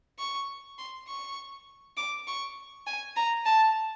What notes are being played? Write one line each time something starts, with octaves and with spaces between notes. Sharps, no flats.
C#6
C6
C#6
D6
C#6
G#5
A#5
A5